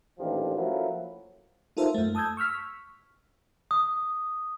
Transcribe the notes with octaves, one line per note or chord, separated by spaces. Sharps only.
A1 D2 A#2 D#3 F3 G4
F3 F#3 A3 A#3 C#4 E4
D#4 F4 A4 A#4 C5 E5
F#2 A3
A5 D#6 E6 G6 G#6
C#6 E6 F6 B6
D#6